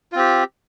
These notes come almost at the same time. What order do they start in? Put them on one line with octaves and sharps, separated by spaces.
F4 C4 G4